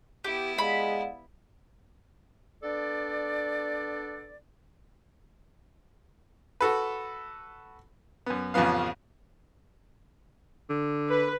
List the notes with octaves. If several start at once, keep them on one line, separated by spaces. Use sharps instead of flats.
B3 E4 G4
G#3 D5 F5 F#5 B5
B3 D4 A4 D5
F#4 A4 B4
F#2 B3
A1 F2 C#3 F3 B3 F5
D3
B4